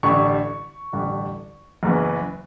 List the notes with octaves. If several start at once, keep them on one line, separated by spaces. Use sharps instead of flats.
A1 G2 D3 G3 C#6
A1 G2 D3 G3
F#1 F#2 C#3 E3 B3